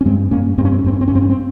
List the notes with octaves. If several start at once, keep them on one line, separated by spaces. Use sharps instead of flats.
C#4
G2 G#3 C4
G2 A#3 C#4
G2 C4
C#4
C4
C#4
G2 C4
C#4
C4
G2 C#4
C4
C#4
C4